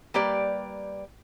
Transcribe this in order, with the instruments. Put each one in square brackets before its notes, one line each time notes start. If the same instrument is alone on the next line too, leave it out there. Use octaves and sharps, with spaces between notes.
[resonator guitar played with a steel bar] G3 A#3 G4 B4 D5